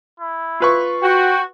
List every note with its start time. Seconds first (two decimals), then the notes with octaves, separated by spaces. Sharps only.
0.20 E4
0.60 F4 B4 C#6
1.03 F#4 G5